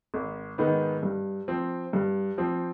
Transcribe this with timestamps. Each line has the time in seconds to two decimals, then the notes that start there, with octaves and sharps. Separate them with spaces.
0.14 G#1
0.58 G#2 D#3 B3
1.03 G2
1.48 F3 C4
1.93 G2
2.38 F3 C4